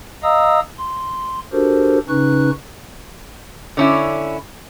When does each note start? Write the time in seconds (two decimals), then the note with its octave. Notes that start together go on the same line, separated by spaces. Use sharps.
0.23 D#5 F5 A#5 D#6 E6
0.78 C6
1.52 D4 F#4 G4 A4 A#4 C5
2.08 C#3 C#4 D#4 B4 C#6 F#6
3.77 D3 C#4 E4